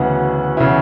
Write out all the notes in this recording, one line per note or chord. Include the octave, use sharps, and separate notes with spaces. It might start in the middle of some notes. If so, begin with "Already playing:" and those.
Already playing: D2 C#3 E3 B3 E4 F#4 F#5
C#3 E3 B3 E4